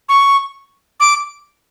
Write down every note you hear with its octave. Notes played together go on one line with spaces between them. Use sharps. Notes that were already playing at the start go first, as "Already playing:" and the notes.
C#6
D6